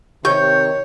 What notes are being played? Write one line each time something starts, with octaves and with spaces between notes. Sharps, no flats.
C3 D#3 G4 C#5 G6